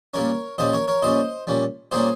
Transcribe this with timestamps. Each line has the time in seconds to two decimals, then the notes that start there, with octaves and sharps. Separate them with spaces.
0.14 A#2 G3 C#4 A#4 C#5
0.58 A#2 G3 C#4 C5 D#5
0.73 A#4 C#5
0.88 A#4 C#5
1.02 A#2 G3 C#4 C5 D#5
1.47 A#2 G3 C#4
1.91 A#2 G3 A#3 C#4 G#4 C5